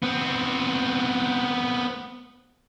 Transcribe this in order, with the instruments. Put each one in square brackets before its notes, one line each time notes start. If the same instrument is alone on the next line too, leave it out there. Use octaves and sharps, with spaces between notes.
[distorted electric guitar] B3 C4